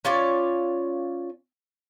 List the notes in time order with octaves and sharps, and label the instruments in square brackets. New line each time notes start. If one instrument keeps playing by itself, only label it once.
[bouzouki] C#4 F4 C#5 D5